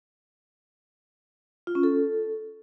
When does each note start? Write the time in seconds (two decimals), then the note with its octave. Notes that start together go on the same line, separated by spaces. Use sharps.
1.67 F4
1.75 C#4
1.83 A4